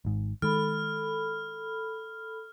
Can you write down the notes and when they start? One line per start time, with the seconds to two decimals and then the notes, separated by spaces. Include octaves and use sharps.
0.05 G#1 G#2
0.42 D#3 G#3 A4 B5 F6